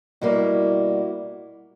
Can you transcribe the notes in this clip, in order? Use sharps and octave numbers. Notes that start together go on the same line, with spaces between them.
B2 G3 A#3 E4 F#4